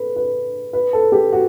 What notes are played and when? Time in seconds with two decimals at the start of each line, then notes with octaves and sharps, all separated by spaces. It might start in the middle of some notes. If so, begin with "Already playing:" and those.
Already playing: A4 B4
0.16 B4
0.73 B4
0.93 A4
1.12 G4
1.33 F#4